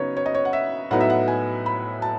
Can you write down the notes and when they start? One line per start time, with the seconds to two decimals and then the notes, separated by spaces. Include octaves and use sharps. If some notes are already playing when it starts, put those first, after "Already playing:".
Already playing: C#3 F#3 B3 D#4 C#5
0.17 C#5
0.26 D#5
0.35 C#5
0.45 F#5
0.53 E5
0.91 A2 F#3 B3 D#4 F#5
1.01 E5
1.10 F#5
1.28 G#5
1.66 B5
2.02 A5